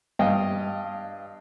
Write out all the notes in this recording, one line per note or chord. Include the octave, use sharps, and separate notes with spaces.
G2 D#5 F5 G5